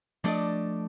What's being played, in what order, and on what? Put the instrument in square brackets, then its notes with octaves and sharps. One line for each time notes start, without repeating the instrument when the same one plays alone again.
[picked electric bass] F3 A3 [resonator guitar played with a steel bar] D4 D5 D#5